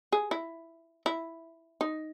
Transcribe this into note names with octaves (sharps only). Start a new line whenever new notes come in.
G#4
E4
E4
D#4